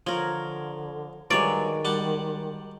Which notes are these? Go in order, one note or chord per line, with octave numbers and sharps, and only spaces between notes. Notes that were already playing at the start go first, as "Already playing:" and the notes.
D3 F3 A#4 C#5
G2 D#3 F#3 G#3 C#5 D5
G3 F#5 A5